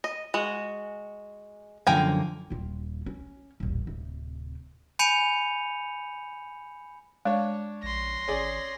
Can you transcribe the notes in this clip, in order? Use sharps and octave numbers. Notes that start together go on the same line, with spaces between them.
D#5
G#3 F#4
F#2 D3 F3 A#3 G5 G#5
D#1 F4
C#4
D#1 A1
D1 C3
G#5 B5 G6 C#7 D#7 F7
G#3 D4 C#5
A#1 C6 A#6
G#1 C#4 G#4 D5